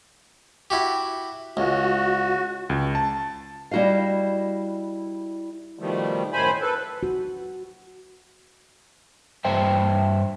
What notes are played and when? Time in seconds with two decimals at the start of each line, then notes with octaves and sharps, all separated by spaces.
0.70 E4 F#4 G4
1.57 C#2 F#4
2.70 C#2
2.95 A5
3.71 G3 E4 F#4 D#5 F5
5.79 B2 D#3 F3 G3 A3
6.33 F#2 A2 D#3 C5 G#5 B5
6.61 A4 B4
7.03 F#4
9.45 G2 C5 E5 G5 A5